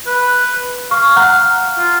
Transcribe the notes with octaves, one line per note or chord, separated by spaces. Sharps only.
B4
F5 C#6
F#5 A#5 F#6
F4